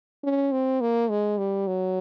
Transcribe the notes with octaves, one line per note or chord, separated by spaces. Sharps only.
C#4
C4
A#3
G#3
G3
F#3